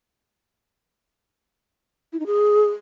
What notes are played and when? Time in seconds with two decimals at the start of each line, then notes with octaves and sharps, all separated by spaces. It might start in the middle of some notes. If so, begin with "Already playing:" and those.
2.13 E4
2.19 D#4
2.26 G#4